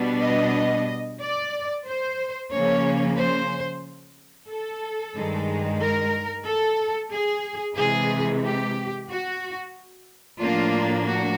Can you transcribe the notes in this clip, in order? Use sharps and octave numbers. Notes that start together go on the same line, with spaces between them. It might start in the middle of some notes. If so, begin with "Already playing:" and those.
Already playing: B2 G3 B3 D4
D#5
D5
C5
C#3 F3 A#3 C#4 C#5
C5
A4
G2 D#3 G#3
A#4
A4
G#4
C3 E3 G#3 G#4
G4
F#4
A2 F3 A#3 D4 F4
F#4